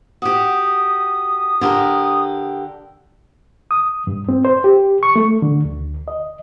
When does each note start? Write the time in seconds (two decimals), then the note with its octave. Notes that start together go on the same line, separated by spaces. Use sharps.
0.22 F#4 G4 D#6
1.61 D3 G4 A#4
3.71 D#6
4.07 G2
4.29 C4
4.45 C5
4.64 G4
5.03 C#6
5.16 A3
5.42 D3
5.65 D2
6.08 D#5